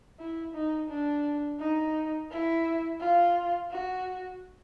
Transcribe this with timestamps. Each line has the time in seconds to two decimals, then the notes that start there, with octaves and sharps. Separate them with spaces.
0.19 E4
0.54 D#4
0.90 D4
1.60 D#4
2.31 E4
3.00 F4
3.71 F#4